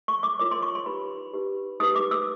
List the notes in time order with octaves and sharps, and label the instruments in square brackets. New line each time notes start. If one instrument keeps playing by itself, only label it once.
[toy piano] C#6
D6
F4 A#4 C#5 D6
C6
C#6
C6
D#4 G4 B4 B5
D#4 G4 B4
D#4 G4 B4 D#6
D6
E6